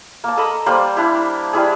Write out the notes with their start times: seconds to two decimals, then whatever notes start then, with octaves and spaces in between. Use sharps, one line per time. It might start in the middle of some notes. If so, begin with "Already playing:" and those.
0.24 A#3 A5
0.37 A4 D#5 A#5 B5
0.66 G3 A#3 C5 D5
0.96 D4 E4 G4
1.53 G3 E4 G#4